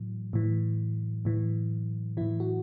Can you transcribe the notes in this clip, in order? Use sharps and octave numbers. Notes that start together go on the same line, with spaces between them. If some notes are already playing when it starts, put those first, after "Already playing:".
Already playing: A2 E3 F#3
A2 E3
A2 E3
A2 E3 E4
F#4